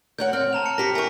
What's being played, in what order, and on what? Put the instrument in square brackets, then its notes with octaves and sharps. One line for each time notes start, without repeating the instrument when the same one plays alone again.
[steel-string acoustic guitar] A#4 C#5 F#5 [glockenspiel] G6
[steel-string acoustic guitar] C4 [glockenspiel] F6
[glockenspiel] A5 A#5 F7
C#7
[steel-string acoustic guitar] C4 G4 A#4 [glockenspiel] A#6 B6
[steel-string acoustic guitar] E4 A#4 [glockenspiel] G#5 C#6